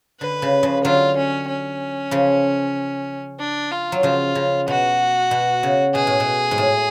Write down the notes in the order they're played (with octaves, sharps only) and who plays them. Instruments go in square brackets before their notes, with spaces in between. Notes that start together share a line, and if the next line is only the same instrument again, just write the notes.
[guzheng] D3 [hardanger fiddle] B4
[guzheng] C#3
C#3 F3
[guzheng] D3 F#3 [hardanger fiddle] F4
[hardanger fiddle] C#4
C#4
[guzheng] C#3 F3
[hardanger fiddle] D4
F4
[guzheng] F#3
[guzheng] C#3 F3 [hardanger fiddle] F4
[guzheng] C#3
[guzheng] B2 [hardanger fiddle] F#4
[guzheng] B2
C#3
[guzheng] B2 [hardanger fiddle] G#4
[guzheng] A2
B2
G#2
A2